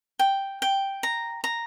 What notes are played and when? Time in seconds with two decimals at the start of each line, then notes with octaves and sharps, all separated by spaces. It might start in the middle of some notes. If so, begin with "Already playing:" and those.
0.19 G5
0.62 G5
1.03 A#5
1.44 A#5